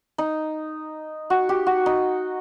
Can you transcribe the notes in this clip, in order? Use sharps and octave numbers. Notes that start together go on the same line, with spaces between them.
D#4
F#4
G4
F#4
D#4